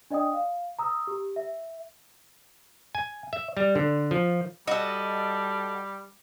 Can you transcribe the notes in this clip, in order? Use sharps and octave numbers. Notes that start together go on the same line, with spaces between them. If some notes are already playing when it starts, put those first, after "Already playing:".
D4 D5 D#5 G5 D#6
F5
A#5 D#6 E6
G4
E5
G#5
E5
G3
D3
F3
G3 F#4 A4 D#5